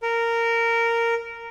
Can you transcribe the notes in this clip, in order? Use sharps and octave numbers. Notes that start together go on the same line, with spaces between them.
A#4